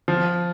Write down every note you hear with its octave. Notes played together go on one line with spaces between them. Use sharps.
F3